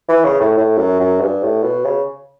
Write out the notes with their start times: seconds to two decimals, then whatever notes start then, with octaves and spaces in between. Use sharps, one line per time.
0.09 E3
0.24 C#3
0.40 A2
0.57 A2
0.78 F#2
1.00 F#2
1.20 G2
1.43 A2
1.63 B2
1.85 C#3